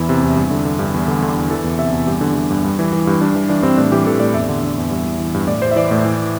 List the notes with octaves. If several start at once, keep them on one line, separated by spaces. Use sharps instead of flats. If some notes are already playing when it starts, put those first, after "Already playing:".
Already playing: E2 E3 E4
C3
E2
G2
D3
D3
G2
E2
D3
D3
E2
E3 A4
E2
C3 E5
E2
G2 G4
D3
D3
G2
G2
E3
E3
G2
G2 D4
E3
E3 D4
G2 C4
A2 D4
E3 G4
E3 A4
A2 D5
E2 E5
D3
D3
E2
G2
E3
E3
G2
A2 D5
E3 C5
E5
E3 D5
A2 D5
E3